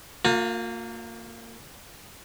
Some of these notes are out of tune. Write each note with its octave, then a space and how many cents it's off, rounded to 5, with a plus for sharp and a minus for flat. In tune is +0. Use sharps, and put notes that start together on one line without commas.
A#3 -25 F4 +35